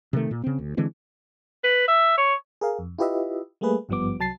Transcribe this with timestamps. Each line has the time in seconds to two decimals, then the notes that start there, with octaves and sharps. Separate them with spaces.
0.13 C3 D#3 A3
0.31 A#2
0.44 C#3 C4
0.59 D2
0.77 D3 E3 G#3 C4
1.64 B4
1.88 E5
2.18 C#5
2.61 G#4 A#4 F5
2.79 F2
2.98 E4 F4 G4 B4 D#5 E5
3.61 G3 A3 A#3 G#4 B4
3.89 G#1 G2 F3 G3 B3 D6
4.19 C2 F#3 A5 A6 C7